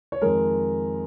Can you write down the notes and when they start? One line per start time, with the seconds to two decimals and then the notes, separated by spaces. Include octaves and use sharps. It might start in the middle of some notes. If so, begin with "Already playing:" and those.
0.12 C#5
0.22 F2 D#3 G#3 A#4